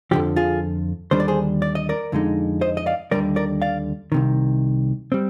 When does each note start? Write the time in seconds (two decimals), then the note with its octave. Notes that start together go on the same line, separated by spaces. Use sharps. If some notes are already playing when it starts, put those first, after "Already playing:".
0.11 F2 D3 F3 G4
0.36 F4 G#4
1.11 D#2 D3 G3 D4 C5
1.20 D5
1.28 G#4 C5
1.62 D5
1.75 D#5
1.89 A#4 D5
2.12 F2 D3 G#3 D#4
2.61 C5 D#5
2.77 D#5
2.86 D5 F5
3.11 D#2 D3 G3 A#4 D5
3.36 A#4 D5
3.62 D5 F5
4.12 C2 C3 D#3
5.12 G3 C4